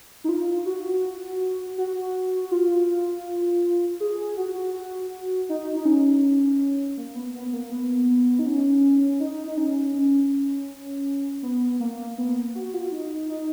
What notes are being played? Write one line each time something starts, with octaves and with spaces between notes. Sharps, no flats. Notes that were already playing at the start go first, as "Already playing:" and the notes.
D#4
F4
F#4
F#4
F4
G#4
F#4
F#4
D#4
D#4
C#4
A#3
B3
B3
A#3
B3
D#4
C#4
D#4
D#4
C#4
C#4
B3
A#3
B3
F#4
F4
D#4
D#4